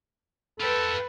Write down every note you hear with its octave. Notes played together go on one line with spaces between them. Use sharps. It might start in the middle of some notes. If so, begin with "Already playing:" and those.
F4 A4 B4 G5